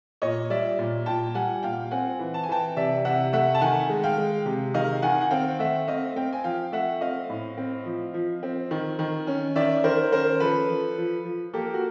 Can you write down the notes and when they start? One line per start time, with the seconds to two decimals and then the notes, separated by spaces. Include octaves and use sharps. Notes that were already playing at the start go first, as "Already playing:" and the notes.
0.22 A#2 C#5 D#5
0.50 G3 D5 E5
0.79 A#2
1.06 A#2 G5 A5
1.34 G3 F#5 G#5
1.63 A#2 F5 G5
1.91 C4 F#5 G#5
2.19 E3
2.34 A5
2.43 G#5
2.49 E3 G5 A5
2.77 C3 D5 E5
3.05 C3 E5 F#5
3.33 A3 E5 F#5
3.55 A5
3.61 D#3 F#5 G#5
3.89 G#3
4.03 F5 G5
4.18 G#3
4.46 C3
4.74 D#3 D#5 F5
5.02 D#3 F#5 G#5
5.21 F#5
5.31 C4 F5 G5
5.59 A3 E5 F#5
5.88 C4 D#5 F5
6.16 C4 F5 G5
6.33 G#5
6.44 F3 F5 G5
6.72 A3 E5 F#5
7.01 C4 D#5 F5
7.30 A2
7.58 C4
7.85 F3
8.14 F3
8.43 C4
8.71 D#3
8.99 D#3
9.27 C#4
9.56 D#3 D5 E5
9.84 D#3 A#4 C5
10.12 C#4 A#4 C5
10.40 F3 A4 B4
10.69 F3
10.98 F3
11.25 F3
11.53 A#3 G4 A4
11.74 F#4